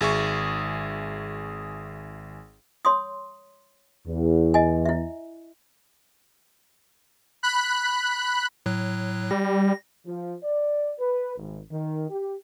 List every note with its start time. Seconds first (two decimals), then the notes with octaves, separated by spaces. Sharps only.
0.01 G#1 G#4 E5 C#6
2.85 C#5 C6 D#6
4.07 E2
4.54 D#5 G#5
4.86 E4 E5
7.43 B5 F#6
8.66 A2 F#3 F#6
9.31 G3 A#6
10.06 F3
10.43 D5
10.99 B4
11.37 G#1
11.71 D#3
12.09 G4